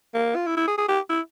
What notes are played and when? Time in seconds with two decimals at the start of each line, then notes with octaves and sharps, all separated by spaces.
0.14 A#3
0.36 F4
0.47 E4
0.57 E4
0.68 G#4
0.78 G#4
0.88 G4
1.09 E4